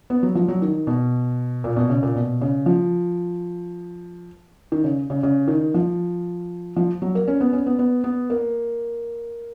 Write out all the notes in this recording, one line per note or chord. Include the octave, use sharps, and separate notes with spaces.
B3
F#3
F3
F#3
D#3
B2
A#2
B2
C#3
A#2
B2
C#3
F3
D#3
C#3
C#3
C#3
D#3
F3
F3
F#3
A#3
C#4
B3
C#4
B3
B3
B3
A#3